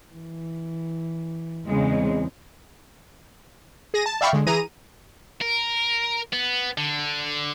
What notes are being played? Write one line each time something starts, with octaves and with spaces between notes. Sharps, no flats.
E3
E2 C#3 G#3 C4
G#4 A#6 D#7
A5
D5 E5 F5 G5 B5 C#6
D3 G#3
E3 G#4 A#5 D#7
A#4
B3
D3